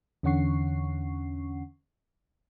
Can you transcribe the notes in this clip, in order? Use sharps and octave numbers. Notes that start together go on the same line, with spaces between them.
E2 D3 C#4 F#5 C#6 C7